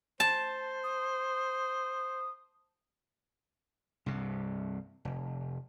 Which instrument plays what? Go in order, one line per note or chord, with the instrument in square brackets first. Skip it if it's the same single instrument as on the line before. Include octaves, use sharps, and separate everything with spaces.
[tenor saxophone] C5 [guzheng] A5
[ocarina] D#6
[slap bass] C2 G2 C3
F1